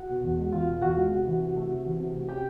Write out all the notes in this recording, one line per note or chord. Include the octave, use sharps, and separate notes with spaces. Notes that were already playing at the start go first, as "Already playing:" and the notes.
Already playing: F#4 F#5
B2
E2
G#3
E2 F4 F5
B2
E2 F#4 F#5
G#3
C3
E3
C3
A3
C3
E3
C3
A3
C#4 G4 G5